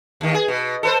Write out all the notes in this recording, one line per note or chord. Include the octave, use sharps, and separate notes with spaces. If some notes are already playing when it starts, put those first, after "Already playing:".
D#2 D#3
G#4
B2
A4 B4 C5